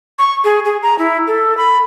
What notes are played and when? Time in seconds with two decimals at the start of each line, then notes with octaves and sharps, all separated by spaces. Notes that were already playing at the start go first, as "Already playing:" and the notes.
0.19 C#6
0.44 G#4
0.65 G#4
0.83 A#5
0.99 E4
1.27 A4
1.57 B5